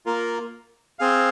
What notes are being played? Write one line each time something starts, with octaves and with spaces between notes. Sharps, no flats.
A#3 F4 A#4
C4 G#4 F5